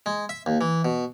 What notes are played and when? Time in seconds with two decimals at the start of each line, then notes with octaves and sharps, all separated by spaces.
0.06 G#3
0.29 E5
0.46 D#2
0.61 E3
0.85 B2